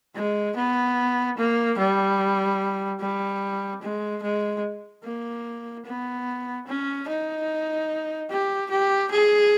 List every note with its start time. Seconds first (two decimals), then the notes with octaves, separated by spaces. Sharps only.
0.16 G#3
0.56 B3
1.38 A#3
1.78 G3
3.00 G3
3.82 G#3
4.23 G#3
5.04 A#3
5.86 B3
6.67 C#4
7.08 D#4
8.30 G4
8.70 G4
9.11 G#4